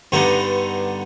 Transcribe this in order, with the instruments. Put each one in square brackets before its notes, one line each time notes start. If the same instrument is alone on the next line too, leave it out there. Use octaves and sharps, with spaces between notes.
[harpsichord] G2 D3 B3 D#4